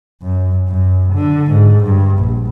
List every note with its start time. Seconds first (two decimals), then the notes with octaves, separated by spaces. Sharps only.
0.22 F#2
0.68 F#2
1.14 D3
1.52 G#2
1.84 G2
2.18 A#1